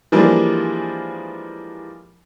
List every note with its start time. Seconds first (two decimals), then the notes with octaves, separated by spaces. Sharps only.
0.12 E3 F3 G3 G#3 A#3 D4